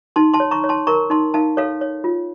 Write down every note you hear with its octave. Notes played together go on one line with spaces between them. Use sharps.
D#4 A5 C6
A5 C6
C#5
A#5 C#6
C#5
A5 C6
A#4 A#5 C#6
D#4 A5 C6
D#4 F5 A5
A4 C#5 F5
C#5
F4